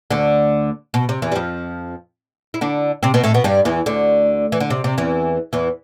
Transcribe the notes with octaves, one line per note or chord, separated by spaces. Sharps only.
D2 D3
B2
C3
E2 E3
G3
F2 F3
E4
D3 D4
C3 C4
B2 B3
A2 A3
B2 B3
G2 G3
E2 E3
D2 D3
E3
D3
C3
C3
E2 E3
E2 E3